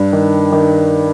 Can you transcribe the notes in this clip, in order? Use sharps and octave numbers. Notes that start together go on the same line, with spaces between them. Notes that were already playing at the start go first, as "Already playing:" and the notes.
Already playing: G2
D#3
D#3